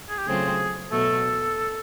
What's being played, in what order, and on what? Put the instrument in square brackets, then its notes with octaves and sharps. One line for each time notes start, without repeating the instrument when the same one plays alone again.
[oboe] G#4
G4
[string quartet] C#3 F#3 A3 C4 F4 [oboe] G#4
[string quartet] B2 F#3 A3 [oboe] A4